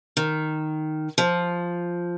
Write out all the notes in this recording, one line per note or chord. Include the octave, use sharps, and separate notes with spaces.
D#3
F3